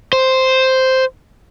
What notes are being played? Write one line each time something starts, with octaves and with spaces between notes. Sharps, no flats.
C5